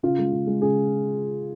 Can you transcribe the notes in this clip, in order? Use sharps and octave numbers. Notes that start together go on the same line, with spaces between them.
C#3 F4
G#3
C#3
G#3
C#3 G#4